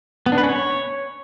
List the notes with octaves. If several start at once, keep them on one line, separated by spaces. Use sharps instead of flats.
B3
D4
B4
C#4
C#5